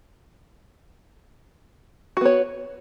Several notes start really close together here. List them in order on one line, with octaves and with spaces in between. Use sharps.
F#4 B3 C#5